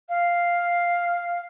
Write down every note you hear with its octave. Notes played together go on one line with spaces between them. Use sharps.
F5